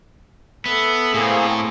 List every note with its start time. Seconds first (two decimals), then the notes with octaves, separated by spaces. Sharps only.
0.66 B3 A4 E5
1.14 A2 A#3 C4 G#4